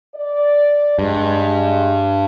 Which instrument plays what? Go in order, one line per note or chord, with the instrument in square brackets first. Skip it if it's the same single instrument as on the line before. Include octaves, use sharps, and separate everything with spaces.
[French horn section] D5
[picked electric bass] G2 [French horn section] G#3